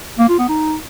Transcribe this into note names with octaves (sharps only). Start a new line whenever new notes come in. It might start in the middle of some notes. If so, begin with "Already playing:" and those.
A#3
F4
B3
D#4